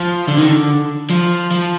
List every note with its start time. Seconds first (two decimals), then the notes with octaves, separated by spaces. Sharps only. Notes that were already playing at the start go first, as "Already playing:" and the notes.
Already playing: F3
0.28 D3
0.38 D#3
0.46 D3
1.10 F3
1.51 F3